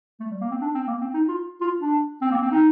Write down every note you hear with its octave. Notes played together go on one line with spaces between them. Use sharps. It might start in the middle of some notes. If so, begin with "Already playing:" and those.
A3
G3
A#3
C4
D4
C4
A#3
C4
D#4
F4
F4
D4
C4
A#3
C4
D#4